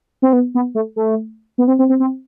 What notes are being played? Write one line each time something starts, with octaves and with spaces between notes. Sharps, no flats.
C4
B3
B3
A3
A3
B3
C4
C4
C4
C4